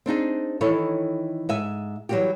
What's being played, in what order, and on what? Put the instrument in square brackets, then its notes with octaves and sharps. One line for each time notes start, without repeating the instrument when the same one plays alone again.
[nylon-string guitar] C4 D4 D#4 G#4
D#3 E3 D#4 E4 A4 C#5
G#2 E5 G#5
E3 F#3 G3 A3 F#4 G4